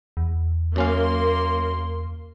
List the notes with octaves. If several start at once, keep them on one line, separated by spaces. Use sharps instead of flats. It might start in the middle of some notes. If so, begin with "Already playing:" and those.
E2
F#2 A#3 C#4 F5 C6